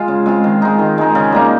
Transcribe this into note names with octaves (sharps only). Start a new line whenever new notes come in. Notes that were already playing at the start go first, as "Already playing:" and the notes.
Already playing: G#3 F4
C#3
G#3 C4 F4
D#3
G#3 D#4
D#3
G#3 D#4
C#3
G3 A#3 D#4